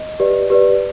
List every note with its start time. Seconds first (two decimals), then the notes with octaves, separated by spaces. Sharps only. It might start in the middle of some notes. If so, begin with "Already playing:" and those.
Already playing: D#5
0.20 G4 B4 D5
0.50 G4 B4 D5